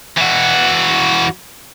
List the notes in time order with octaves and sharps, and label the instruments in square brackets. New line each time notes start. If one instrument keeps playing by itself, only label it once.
[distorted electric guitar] E3 F#4